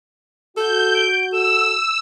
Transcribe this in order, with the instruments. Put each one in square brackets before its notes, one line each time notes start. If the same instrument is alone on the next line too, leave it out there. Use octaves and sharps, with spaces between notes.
[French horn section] F#4 [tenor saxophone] A4 [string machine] G6
[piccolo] D7
[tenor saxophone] A4 [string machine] E6 [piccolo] E7